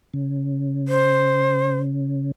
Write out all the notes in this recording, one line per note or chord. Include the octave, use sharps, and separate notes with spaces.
C#3
C5